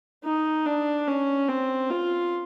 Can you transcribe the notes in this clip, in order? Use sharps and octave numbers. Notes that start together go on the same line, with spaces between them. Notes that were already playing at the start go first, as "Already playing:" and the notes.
D#4
D4
C#4
C4
F4